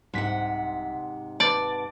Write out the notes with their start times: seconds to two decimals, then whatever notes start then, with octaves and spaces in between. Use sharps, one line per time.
0.14 C2 G#2 C3 F#5 B6
1.40 B4 D5 A5